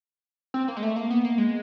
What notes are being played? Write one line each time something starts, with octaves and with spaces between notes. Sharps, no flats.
C4
A#3
G#3
A3
A#3
B3
A#3
G#3